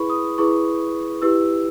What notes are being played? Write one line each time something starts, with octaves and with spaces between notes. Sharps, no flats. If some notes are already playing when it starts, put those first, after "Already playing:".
Already playing: E4 G#4 B4 B5 C#6
D#6
E4 G#4 B4 C#6
E4 G4 B4 E6